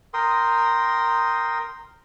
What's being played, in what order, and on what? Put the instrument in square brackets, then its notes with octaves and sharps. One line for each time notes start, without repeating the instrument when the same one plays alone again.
[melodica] A#4 G5 C6 D#6